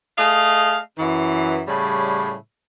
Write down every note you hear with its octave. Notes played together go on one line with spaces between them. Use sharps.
A3 G#4 D#5 F5
F#2 E3
A2 C#3 G3